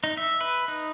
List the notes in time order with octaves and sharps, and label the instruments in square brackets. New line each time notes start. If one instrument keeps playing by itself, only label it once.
[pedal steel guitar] D#4
E5
B4
D#4